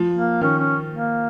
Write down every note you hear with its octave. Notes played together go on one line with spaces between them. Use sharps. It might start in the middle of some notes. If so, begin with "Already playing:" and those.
Already playing: F3
A#3
D#3 C#4
C#4
A#3